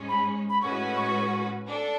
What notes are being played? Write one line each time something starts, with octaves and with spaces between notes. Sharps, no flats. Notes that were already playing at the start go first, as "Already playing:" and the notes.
Already playing: G#2 G#3 C#4
B5
B5
A2 G#3 C#4 F#4 B4 C#6
C#6
D4 A4